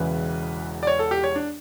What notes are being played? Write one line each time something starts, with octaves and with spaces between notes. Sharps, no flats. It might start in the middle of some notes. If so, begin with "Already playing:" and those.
Already playing: E1 E2 C#3 E3 B4
D5
C#5
A4
G4
C#5
D4